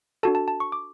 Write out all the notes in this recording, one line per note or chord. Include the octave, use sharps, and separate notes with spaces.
D4 F#4 A4 A5
A5
A5
C#6
D6